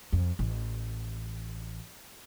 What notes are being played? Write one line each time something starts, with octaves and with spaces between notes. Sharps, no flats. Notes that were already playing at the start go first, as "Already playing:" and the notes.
F2
A1